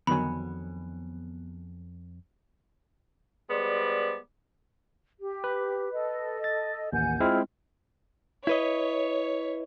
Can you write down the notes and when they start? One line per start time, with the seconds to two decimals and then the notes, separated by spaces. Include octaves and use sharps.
0.07 F2 D3 D#3 F#3 B3 G#5 B5
3.50 G3 G#3 B3 C5 D5
5.20 G4
5.44 B4
5.93 A4 D#5
6.44 A6
6.93 A1 D#2 F#5 G#5 G6
7.20 G#3 C4 E4 F4 F6
8.47 E4 B4 C#5 D#5